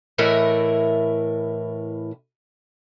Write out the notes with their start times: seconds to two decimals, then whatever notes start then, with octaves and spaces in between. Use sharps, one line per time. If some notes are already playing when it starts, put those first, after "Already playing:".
0.18 A2 E3 E4 A#4 D#5